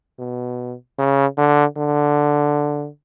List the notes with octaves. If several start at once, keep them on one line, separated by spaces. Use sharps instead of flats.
B2
C#3
D3
D3